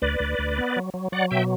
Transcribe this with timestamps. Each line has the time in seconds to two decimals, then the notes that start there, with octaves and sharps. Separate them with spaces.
0.02 D2 B4 D5
0.20 D2
0.39 D2
0.58 B3
0.76 F#3
0.94 F#3
1.12 F#3 D5 F#5
1.31 B2 E5 G5